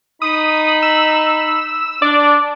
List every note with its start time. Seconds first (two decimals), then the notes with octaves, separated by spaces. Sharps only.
0.22 D#4 B5 D#6
0.82 E6
2.02 D4 D5